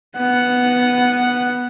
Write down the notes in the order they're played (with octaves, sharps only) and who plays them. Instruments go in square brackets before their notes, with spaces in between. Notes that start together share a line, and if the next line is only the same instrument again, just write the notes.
[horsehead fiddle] B3 F#5